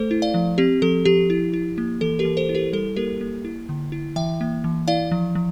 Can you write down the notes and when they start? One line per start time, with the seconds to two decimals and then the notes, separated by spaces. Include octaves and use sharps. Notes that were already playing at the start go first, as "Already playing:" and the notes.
Already playing: A3 A4 C5
0.11 E4
0.22 D5 F5
0.34 F3
0.58 C4 G4
0.82 F3 A4
1.05 F3 G4
1.30 E4
1.53 E4
1.78 A#3
2.01 E3 A4
2.19 G4 A#4
2.25 E3
2.37 A4 C5
2.49 E4
2.55 G4 A#4
2.73 G3 A4
2.96 A#3 G4 A#4
3.21 A#3
3.45 E4
3.69 D3
3.92 E4
4.16 E3 E5 G5
4.41 A#3
4.64 E3
4.88 E4 D5 F5
5.12 F3
5.35 F3